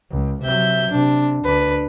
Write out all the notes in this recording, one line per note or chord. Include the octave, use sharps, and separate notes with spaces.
C#2
C3 F#3 E5 G6
C3 D4
D2 D4 B4